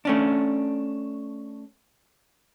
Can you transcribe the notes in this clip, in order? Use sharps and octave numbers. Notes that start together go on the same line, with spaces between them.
A3 C#4 D4